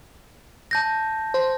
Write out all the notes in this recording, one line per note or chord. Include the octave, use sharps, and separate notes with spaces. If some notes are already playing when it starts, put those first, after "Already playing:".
A5 G6 A#6
C5